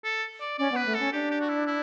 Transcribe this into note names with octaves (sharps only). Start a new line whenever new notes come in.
A4
D5
C#4 D5
B3 B4
A3
C#4 A4
D4 G4
G4
F#4
E4
E4